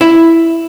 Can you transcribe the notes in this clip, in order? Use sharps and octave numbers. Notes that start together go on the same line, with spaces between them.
E4